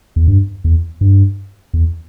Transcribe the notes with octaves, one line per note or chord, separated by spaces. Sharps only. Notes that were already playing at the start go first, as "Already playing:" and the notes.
E2
G2
E2
G2
E2